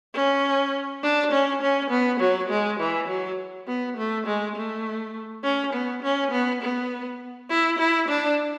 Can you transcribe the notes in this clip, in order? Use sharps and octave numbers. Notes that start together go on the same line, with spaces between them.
C#4
D4
C#4
C#4
B3
F#3
G#3
E3
F#3
B3
A3
G#3
A3
C#4
B3
C#4
B3
B3
E4
E4
D4